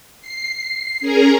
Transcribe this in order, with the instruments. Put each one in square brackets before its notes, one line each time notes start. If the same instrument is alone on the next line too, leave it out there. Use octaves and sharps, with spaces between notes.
[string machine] C7
C#4 G#4 A#4 A#5